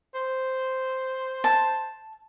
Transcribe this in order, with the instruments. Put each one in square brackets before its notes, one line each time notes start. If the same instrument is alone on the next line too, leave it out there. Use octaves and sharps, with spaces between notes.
[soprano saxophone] C5
[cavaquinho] A5